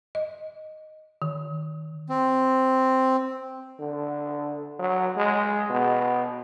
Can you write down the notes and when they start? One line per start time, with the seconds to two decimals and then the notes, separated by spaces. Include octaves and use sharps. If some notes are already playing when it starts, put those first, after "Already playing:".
0.15 D#5
1.22 D#3
2.10 C4
3.80 D3
4.79 F#3
5.17 G#3
5.70 B2